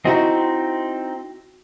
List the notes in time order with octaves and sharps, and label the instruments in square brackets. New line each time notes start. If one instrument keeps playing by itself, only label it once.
[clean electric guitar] C4 D#4 [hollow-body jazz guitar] E4 F#4 D#5